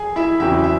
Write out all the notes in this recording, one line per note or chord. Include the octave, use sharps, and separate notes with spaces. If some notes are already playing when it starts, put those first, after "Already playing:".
Already playing: G#4 G#5
E4 E5
E2 C#3 F#3 C4 E4 E5
E5